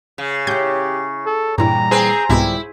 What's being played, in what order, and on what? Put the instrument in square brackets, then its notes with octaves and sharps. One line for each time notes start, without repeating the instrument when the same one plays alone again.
[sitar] C#3
[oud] C#4 E4 [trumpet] G4 [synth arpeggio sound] G6
[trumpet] A4
[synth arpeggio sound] G2 E4 [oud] A#2 E3 G3 [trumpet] A#5
[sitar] C4 G#4 [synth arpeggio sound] B4
[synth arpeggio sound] C2 G#2 B2 [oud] D3 F3 G3 [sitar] E4